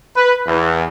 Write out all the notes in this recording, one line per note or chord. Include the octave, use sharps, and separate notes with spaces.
B4
E2